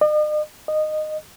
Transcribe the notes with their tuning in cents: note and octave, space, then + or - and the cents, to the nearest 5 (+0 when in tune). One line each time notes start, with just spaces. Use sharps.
D#5 -45
D#5 -15